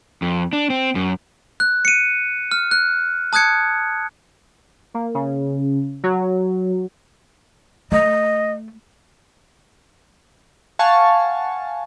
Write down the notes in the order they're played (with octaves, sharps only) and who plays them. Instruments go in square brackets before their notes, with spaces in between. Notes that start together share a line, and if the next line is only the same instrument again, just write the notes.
[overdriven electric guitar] F2
D4
C4
F#2
[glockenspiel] F#6
C#7 D#7
F6
F#6
A5 D#6 F#6 G#6 C#7
[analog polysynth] A#3
C#3
F#3
[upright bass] A3 [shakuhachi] D#5
[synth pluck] F5 F#5 G#5 A5 C#6